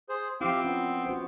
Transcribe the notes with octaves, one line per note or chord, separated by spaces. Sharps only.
G#4 C5
F3 C4 E4 G4 F5
B3 C#4
F#4 C5